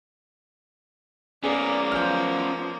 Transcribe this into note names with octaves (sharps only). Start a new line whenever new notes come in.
A#3 B3 C#4 G#4 D5
F3 F6 G6